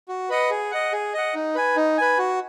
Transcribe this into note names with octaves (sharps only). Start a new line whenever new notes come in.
F#4
B4 D#5 F#5
G#4
D#5 F#5
G#4
D#5 F#5
D#4
B4 G#5
D#4
B4 G#5
F#4